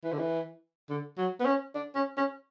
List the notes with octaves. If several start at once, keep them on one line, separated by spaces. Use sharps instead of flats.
E3
D3
E3
D3
F#3
B3
C#4
D4
C#4
C#4